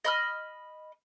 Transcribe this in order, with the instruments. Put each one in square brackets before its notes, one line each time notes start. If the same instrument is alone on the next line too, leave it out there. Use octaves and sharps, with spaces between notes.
[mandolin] D#5 B5 F6